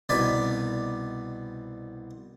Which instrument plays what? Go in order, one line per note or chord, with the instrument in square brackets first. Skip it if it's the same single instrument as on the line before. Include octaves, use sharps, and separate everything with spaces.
[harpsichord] C2 B2 D#4 D5 G#5 B5